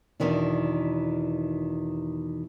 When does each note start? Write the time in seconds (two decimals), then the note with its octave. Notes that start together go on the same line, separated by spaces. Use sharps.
0.20 E2 B2 D#3 E3 D4